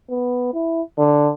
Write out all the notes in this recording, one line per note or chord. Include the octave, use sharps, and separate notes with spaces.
B3
E4
D3